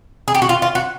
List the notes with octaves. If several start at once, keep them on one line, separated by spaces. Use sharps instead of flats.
G#4
G4
F#4
F4
F4
F#4